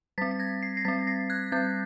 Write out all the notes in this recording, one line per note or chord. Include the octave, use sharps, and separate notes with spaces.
G3 C4 A6 B6
B6
G#6 A#6
C7
A#6 C7
G3 C4 A6 B6
A#6 C7
F#6 G#6
G3 C4 G6 A6